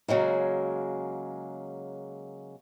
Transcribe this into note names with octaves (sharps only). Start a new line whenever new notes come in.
C#3 F#3 G#3 A#3